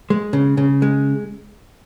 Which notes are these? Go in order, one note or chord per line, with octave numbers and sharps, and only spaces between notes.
G#3
C#3
C#3
G#3